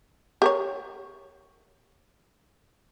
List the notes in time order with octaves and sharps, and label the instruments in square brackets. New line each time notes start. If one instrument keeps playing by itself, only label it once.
[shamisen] G4 A#4 C#5